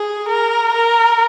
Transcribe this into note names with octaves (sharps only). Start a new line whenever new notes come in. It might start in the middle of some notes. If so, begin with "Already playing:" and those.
Already playing: G#4
A#4
A#4